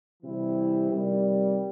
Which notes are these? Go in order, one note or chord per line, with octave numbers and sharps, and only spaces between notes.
C3 E3 G3 C4 E4
C3 D#3 G3